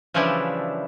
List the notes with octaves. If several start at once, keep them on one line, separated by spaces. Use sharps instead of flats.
C#3 E3 F3 G3 D4 E4